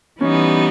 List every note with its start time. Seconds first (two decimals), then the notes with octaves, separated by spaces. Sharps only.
0.21 E3 G3 B3 C#4 D#4